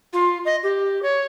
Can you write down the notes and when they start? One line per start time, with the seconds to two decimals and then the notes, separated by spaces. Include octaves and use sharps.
0.13 F4
0.45 D#5
0.63 G4
1.02 C#5